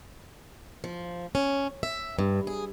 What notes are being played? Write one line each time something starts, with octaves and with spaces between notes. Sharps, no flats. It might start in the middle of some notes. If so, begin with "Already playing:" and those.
F3
C#4
E5
G2
G#4